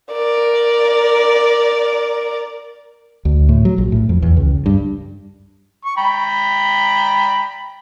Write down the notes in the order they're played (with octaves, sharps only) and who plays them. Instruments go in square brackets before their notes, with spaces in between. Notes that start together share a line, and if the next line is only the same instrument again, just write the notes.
[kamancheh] A#4 D5
[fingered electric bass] D2
A2
F#3
A#1
A2
F2
E2
C#2
G2
[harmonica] C#6
G5 A#5 B5